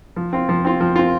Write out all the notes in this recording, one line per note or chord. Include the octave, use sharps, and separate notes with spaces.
F3
C4 F4
F3
C4 F4
F3
C4 F4